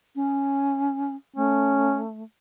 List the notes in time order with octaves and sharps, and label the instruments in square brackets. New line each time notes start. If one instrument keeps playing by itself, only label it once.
[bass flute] C#4
[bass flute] A3 [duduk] C#4